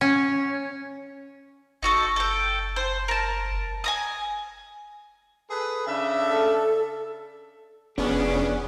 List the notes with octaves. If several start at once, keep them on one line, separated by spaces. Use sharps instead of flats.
C#4
F#1 D#4 F#4 A4
A4 G5
C5
A#4 A5
G#5 A#5 D#6
G#4 A4 B4
C#3 D4 E5
A4
F1 B3 C#4 D4 G#4